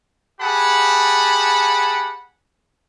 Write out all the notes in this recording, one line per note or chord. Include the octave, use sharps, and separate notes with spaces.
G4 G#4 F#5 A5 B5